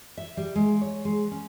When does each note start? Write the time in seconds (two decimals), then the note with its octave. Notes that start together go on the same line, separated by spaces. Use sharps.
0.17 E5
0.37 G3
0.56 G#3
0.81 C#5
1.05 G#3
1.31 C#4